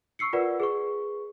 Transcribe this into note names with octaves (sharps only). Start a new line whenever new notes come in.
C#6 E6 C7 C#7
F4 A#4 B4 D5 F#5
G#4 B4 C#6